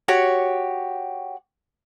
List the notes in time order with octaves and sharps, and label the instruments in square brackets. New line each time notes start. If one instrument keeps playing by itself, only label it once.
[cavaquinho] F#4 G4 C#5